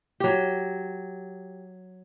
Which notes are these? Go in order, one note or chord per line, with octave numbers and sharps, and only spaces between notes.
F#3 G4